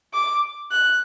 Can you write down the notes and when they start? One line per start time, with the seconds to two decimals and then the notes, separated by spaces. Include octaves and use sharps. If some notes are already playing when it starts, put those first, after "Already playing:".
0.14 D6
0.71 F#6